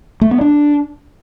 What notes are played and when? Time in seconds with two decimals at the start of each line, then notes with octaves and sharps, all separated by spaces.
0.21 A3
0.31 B3
0.41 D4